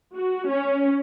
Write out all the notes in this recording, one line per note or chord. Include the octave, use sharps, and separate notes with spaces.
F#4
C#4